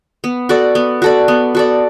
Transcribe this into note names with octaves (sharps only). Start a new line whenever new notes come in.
B3
F#4 A4 D5
B3
F#4 A4 D5
B3
F#4 A4 D5